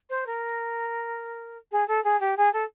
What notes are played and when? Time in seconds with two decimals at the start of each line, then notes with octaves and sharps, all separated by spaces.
0.10 C5
0.26 A#4
1.72 G#4
1.88 A4
2.04 G#4
2.20 G4
2.37 G#4
2.53 A4